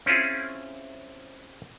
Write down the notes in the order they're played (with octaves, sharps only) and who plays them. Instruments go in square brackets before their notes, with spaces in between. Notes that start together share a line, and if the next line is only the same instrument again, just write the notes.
[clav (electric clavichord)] C4 C#4 E4 F4 G#4